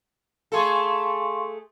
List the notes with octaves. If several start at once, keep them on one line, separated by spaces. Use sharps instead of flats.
A3 G#4 A4 F5 C6 C#6